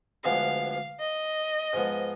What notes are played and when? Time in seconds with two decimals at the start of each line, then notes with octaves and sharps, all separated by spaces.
0.24 D2 D3 F3 G#3 B3 F5
0.99 D#5
1.73 G#2 F3 B3